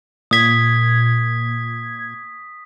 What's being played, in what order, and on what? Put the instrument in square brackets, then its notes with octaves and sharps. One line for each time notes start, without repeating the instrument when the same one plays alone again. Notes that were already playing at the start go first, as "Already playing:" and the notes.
[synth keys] A#2 G#6 [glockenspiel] D#6 B6